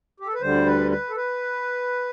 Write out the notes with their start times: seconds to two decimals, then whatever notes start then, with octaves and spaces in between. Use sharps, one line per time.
0.20 G4
0.27 A4
0.34 B4
0.41 D2 D3 G3 C5
0.66 B4
0.91 B4
1.10 A4
1.16 B4